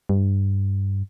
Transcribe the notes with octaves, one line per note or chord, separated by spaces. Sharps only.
G2